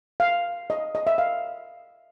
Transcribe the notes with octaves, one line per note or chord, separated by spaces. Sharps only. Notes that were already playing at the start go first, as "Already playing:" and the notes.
F5
D#5
D#5
E5
F5